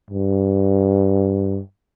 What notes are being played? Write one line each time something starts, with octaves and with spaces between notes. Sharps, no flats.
G2